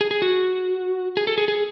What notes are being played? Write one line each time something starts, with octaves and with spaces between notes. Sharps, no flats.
G#4
G#4
F#4
G#4
A4
G#4
G#4